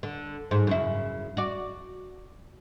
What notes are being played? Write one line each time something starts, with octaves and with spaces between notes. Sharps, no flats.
D3
G#2
F#2 C#3 E4
F#4 D5